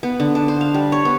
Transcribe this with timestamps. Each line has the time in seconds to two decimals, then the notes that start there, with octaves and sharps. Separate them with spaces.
0.03 B3
0.20 D3
0.35 D4
0.48 C5
0.61 F5
0.74 G3
0.92 C#5
1.05 B3